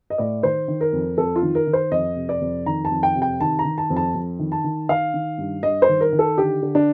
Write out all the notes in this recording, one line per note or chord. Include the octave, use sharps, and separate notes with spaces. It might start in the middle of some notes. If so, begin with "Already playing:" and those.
D#5
A2 D5
D#3 C5
D#3
A#4
F2
F2 A4
F4
D#3
A#4
D#3
C5
F2 D#5
C3
D5
F2
D#3 A#5
A5
F2
G5
C3
G5
D#3 A5
A#5
D#3
A5
F2
A5
F2
D#3
A5
D#3
D#3 F5
D#3
G2
G2 D#5
C5
D#3
A#4
D#3
A4
D3 G4
D3
D4